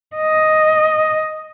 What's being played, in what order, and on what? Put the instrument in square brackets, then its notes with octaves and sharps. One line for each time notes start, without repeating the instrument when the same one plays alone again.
[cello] D#5